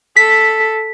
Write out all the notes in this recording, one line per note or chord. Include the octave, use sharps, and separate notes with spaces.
A4 B6